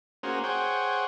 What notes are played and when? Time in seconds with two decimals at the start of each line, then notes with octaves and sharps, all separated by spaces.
0.23 A#3 C#4 F#4 G#4 C5
0.44 G#4 C5 C#5 F#5 G5